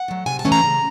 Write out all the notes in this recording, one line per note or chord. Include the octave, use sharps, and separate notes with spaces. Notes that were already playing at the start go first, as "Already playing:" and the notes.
Already playing: F#5
F#3 A3
C3 G#5
A5
E3 A3 C#4
A#5
C#3